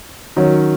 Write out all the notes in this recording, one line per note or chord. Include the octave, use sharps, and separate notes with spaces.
D#3 F#3 C#4